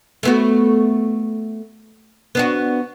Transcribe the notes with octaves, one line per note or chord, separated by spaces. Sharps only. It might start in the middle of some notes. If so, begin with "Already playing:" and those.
A3 B3 F#4
B3 D4 F#4